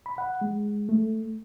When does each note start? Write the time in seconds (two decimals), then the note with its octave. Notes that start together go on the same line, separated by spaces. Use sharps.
0.06 B5
0.18 F#5
0.41 G#3
0.89 A3